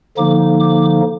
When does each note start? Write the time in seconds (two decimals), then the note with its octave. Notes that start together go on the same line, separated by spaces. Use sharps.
0.17 D3 F3 A#3 D#4 D6
0.59 D6